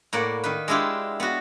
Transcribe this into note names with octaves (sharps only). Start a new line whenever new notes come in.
A2 A#3 D5 F#5
D#3 B4
G#3 D4 E4 F4 G4
B3 F#4